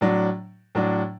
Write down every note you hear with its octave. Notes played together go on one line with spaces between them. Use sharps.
A2 F#3 D4
A2 F#3 D4